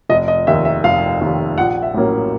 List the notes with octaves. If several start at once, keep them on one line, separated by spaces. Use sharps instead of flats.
F1 D#5
D#5
D#2 D#3 E5
E5
F1 F5
D#2 D#3
A#1 F#5
E5
A2 F#3 A#3 C#4